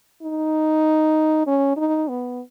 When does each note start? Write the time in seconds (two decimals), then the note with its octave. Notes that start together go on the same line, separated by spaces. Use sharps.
0.23 D#4
1.47 C#4
1.77 D#4
2.08 B3